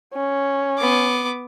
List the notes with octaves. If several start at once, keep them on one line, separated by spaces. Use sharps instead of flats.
C#4
B3 D6